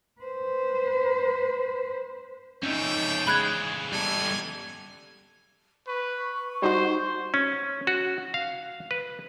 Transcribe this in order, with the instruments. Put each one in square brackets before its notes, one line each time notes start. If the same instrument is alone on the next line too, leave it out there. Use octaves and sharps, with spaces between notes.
[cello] B4 C5
[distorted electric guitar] F2 A3 [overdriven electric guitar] C#4 D#4 [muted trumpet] G5
[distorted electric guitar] C#3 E3 [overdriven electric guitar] G#3 [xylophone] B5 F#6 G#6
[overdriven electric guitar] G3 A4 [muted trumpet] G#5
[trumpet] B4 [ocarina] C#6
[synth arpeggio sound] G3 D#4 F#4 [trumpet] C5
[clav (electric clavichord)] C#4
F#4
F5
B4